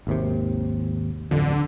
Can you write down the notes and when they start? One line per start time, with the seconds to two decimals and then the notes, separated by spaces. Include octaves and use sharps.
0.07 G#1 D#2 C3
1.31 D1 A1 F2 D3